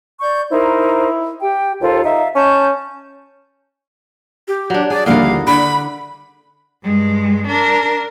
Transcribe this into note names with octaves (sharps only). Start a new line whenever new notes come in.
D5 C#6 G6
D#4 E4 A#4 C5
G4 G5
D#2 F4 A4 C5
D#4 E5 F5
C#4 A5 C#6 G6
G4
F#3 D4
G#4 D5
A#1 D#2 D3 G3 E4 A#4 F5
D3 B5 D7
G2 G#3
D4 A#4